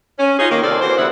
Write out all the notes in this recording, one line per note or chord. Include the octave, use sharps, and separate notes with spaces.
C#4
D#4 F4 F#4 G#4
D#3 A#3
C3 A4 A#4 C5 D5
E3 F#4 C5
G2 D3 B3 E4 F#5